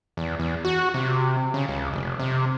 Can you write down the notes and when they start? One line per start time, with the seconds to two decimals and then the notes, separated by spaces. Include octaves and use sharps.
0.17 E2
0.39 E2
0.65 F#4
0.94 C3
1.54 C#3
1.68 C#2
1.93 F1
2.19 C3